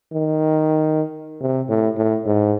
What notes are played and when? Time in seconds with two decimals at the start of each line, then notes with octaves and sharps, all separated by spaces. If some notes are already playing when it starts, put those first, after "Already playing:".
0.13 D#3
1.41 C3
1.69 A2
1.97 A2
2.26 G#2